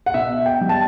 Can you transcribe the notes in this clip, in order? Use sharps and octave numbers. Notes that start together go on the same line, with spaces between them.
F#5
B2 E5
G5
G3
A5